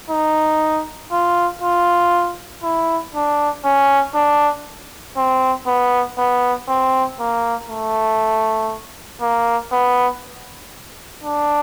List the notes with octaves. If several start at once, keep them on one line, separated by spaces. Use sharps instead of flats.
D#4
F4
F4
E4
D4
C#4
D4
C4
B3
B3
C4
A#3
A3
A#3
B3
D4